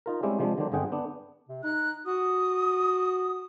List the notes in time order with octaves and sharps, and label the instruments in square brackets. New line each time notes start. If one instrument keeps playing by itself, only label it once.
[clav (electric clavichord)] D#4 F4 A#4
G3 G#3 C4 C#4 E4 G4
C3 F3 G#3 D4
D3 D#3 F#3 A#3 D4 C5
G1 D3 C4 G#4 F#5 G5
B3 D4
[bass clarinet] C3
[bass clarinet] D#4 [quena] F#6
[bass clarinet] F#4 [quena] D#6